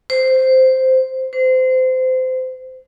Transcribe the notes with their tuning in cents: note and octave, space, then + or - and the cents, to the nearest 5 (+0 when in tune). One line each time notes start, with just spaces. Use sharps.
C5 -5
C5 -25